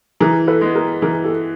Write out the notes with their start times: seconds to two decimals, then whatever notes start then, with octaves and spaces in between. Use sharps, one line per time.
0.20 E3 G#4 A#4
0.47 A4 B4
0.61 G#3 B3
0.75 G#4 A#4
1.02 E3 G#4 A#4
1.24 G4 A4